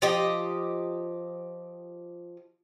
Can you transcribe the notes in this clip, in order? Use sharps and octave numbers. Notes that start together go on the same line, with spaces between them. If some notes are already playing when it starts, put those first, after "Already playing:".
F3 G4 D#5